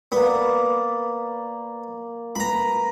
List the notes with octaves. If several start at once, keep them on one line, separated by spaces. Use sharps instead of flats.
A#3 B3 D5
A#4 B4 A#5 B5